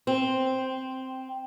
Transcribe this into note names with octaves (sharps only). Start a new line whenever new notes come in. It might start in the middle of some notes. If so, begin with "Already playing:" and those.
C4